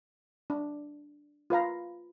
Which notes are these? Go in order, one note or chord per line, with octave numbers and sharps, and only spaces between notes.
D4
F4 B4 F5 A#5